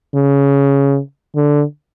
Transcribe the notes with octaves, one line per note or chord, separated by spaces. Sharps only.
C#3
D3